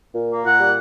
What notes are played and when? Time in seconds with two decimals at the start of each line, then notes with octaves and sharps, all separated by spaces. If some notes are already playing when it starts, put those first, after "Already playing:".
0.14 A#2
0.30 A#3
0.44 A#2 F#5
0.60 G3